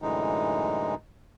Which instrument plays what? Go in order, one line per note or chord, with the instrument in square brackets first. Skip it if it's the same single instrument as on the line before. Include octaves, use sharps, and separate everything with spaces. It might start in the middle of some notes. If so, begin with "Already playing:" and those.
[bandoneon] F#2 A2 D3 E3 G#3 D#4